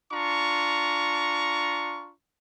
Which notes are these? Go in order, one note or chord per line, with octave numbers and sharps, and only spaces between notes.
D4 F4 A#5 C#6